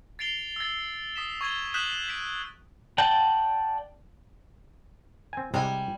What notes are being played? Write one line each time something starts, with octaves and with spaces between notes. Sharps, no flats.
A6 C7 D7 F7 G7
E6 A6
D#6 B6 E7
C#6 G#6 D#7 G7
D#6 F#6 G6 B6 E7 F#7
B6 D7 E7
D5 F#5 G5 A5 G6
C4 G#5
C2 C3 G3 G#3 G#5